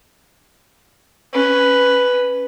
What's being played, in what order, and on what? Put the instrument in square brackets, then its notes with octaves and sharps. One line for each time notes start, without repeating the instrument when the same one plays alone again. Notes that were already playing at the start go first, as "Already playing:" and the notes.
[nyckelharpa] C#4 B4